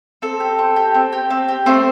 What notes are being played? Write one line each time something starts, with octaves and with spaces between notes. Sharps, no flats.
C4 A4
G4
C4
G4
C4
G4
C4
G4
A3 C4 C5